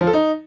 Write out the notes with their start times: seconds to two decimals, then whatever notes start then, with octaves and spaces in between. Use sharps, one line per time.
0.01 F3
0.07 A4
0.13 D#4